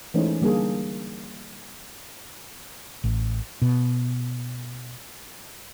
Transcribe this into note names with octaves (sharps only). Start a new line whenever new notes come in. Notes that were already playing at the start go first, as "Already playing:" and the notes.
E3 G#3 A3 C#4 D#4 C5
D3 G3 A#3 D4 G#4
A1
B2